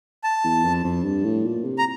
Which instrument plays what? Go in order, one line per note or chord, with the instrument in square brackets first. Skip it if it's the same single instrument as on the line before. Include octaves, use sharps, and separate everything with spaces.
[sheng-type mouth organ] A5
[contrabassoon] E2
F2
F2
G2
A2
A#2
C3
[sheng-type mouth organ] A#5